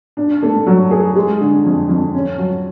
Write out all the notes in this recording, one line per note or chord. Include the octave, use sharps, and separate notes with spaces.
D4
A3
F#3
G#4
G#3
D3
F2
F2
C#4
F#3